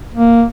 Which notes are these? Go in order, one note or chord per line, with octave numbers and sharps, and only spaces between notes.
A#3